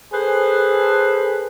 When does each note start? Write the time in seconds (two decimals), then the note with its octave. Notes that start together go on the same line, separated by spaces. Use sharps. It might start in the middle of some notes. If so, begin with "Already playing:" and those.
0.13 G#4 A4 B4 C5